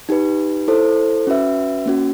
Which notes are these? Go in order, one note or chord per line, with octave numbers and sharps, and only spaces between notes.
D#4 G4 B4
E4 A4 C5
C#4 F#4 B4 E5
A#3 C#4 F#4